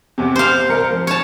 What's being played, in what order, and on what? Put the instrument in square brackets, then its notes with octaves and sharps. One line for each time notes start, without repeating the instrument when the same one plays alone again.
[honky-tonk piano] E2 C3
[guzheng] C5 F5
[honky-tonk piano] C2 A#4 C#7
F3
[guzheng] C#5 A5